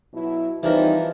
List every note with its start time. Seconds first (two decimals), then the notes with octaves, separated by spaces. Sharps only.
0.14 B2 F#3 E4
0.63 E3 F3 G3 C4 D#4 A#4